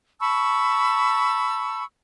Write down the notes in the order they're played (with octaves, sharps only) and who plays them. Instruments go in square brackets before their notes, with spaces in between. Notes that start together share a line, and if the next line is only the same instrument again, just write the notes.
[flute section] A5 B5 C#6 E6